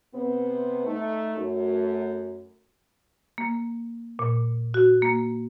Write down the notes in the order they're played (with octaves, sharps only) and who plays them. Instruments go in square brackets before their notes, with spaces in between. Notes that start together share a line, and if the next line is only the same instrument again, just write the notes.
[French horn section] C3 B3 C4
A3 D#4
F#2 A3
[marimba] A#3
A#2
F#4
A#3